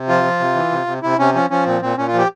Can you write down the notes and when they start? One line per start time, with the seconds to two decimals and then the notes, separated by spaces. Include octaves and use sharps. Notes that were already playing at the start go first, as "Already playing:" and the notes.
Already playing: C3
0.08 F3 F4
0.24 F3
0.40 C3
0.55 E3
0.71 C3
0.87 C3
1.03 C3 E4
1.18 C3 C#4
1.34 F3 C#4
1.50 F3 C#4
1.66 A#2 C4
1.81 A#2 C4
1.97 A#2 C#4
2.08 F4
2.13 F3 G4